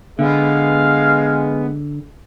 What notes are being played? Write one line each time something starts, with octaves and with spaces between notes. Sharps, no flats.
D3 G#3 B3 F5